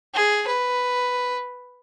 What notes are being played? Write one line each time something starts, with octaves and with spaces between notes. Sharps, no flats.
G#4
B4